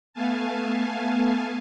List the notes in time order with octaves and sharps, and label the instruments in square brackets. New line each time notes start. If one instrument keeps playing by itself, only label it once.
[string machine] A3 B3 F5 G#5 A5